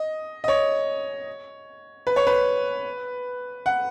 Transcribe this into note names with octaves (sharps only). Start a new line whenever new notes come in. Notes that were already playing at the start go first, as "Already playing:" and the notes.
Already playing: D#5
D#5
C#5
B4
C#5
B4
F#5